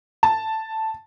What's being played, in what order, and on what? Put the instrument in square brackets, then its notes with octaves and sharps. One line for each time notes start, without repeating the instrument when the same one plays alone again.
[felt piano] A5